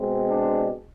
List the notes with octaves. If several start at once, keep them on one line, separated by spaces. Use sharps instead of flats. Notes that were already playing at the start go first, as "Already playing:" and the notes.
Already playing: B2 G#3 C4
D4